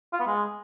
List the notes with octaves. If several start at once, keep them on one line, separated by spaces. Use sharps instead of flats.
F4
B3
G#3